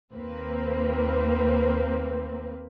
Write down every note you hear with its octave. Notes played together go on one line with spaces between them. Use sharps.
D#2 A#3 C4 B4